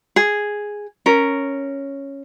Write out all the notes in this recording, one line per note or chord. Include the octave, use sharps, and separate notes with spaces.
G#4
C#4 A#4